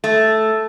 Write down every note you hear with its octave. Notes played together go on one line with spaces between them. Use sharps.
A3